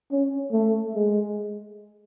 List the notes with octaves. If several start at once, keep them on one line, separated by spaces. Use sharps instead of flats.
C#4
A3
G#3